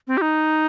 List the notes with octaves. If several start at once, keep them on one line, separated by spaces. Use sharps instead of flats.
C4
G4
D#4